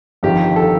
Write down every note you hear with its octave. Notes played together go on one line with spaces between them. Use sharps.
G1 F2 D#3 G4
A4